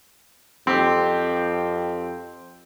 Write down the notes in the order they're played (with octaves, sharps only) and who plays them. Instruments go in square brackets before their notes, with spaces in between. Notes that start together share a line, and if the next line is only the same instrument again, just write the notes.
[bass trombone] F2 [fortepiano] C4 G4